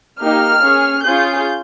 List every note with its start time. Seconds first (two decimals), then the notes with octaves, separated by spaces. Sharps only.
0.20 A#3 D#4 G4 F6
0.62 C#4 G#4
1.04 C#4 F4 G#4 G6